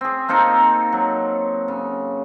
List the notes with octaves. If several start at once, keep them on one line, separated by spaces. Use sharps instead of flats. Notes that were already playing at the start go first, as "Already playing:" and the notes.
C4 G#4
A#3 C4 D#4 A4
F#3
C#3